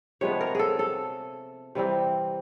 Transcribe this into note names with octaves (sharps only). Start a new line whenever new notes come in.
C3 F3 G#3 B3 C#5
A#4
G#4 A4
A4
C3 E3 G3 C4